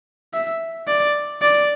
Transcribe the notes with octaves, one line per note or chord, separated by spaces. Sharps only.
E5
D5
D5